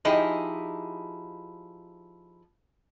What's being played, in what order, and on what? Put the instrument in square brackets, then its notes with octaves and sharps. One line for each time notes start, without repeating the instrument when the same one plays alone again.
[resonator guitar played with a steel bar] F3 D#4 E4 G4 G#4